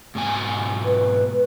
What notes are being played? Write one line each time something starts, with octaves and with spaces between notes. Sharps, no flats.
G#2 B2 G#5
B4